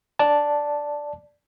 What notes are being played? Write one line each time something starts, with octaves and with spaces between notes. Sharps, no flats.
D5 A5